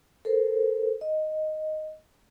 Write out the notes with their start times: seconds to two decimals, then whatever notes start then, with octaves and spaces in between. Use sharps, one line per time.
0.25 A4 A#4 C5
1.01 D#5